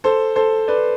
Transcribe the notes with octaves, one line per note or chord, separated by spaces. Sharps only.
A4 C5
A4 C5
B4 D5